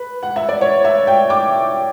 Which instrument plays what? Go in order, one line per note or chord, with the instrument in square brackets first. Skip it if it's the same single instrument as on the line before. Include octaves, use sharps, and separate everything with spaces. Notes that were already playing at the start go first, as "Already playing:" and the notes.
Already playing: [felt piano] B4
F#5
E5
D5
C#5
E5
G5
D6